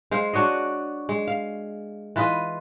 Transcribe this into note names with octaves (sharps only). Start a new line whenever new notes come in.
G#3 C5 F5
D4 F#4 C#5 D#5
G#3
F5
E3 F4 B4 D#5